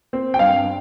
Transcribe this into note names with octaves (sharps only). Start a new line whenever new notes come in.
C4
G5
G2 F5